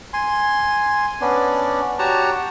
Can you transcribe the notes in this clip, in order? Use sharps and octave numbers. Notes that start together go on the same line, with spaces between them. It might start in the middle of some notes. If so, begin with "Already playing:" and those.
G#5 C6
B3 C#4 D4 D5
F#4 G4 C#5 A5 A#5